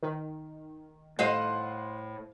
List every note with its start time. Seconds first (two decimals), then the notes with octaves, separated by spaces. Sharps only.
0.03 D#3
1.19 A2 C5 D#5 F5 F#5 C6